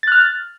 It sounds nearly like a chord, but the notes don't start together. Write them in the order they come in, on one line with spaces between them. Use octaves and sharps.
A6 F#6 F6